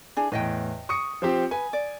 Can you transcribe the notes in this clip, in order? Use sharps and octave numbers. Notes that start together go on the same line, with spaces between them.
D4 E4 G#4
E2 A2 B4 D#5 G5
C#6 D#6 C#7
F3 C4 G4
B4 G#5
D5